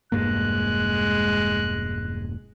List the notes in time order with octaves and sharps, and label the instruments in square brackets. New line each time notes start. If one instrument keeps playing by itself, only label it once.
[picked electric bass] E1 G2 A#3 [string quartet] G#3 [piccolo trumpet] F#6